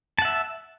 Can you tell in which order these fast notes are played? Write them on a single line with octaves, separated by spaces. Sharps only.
A5 F#5 E5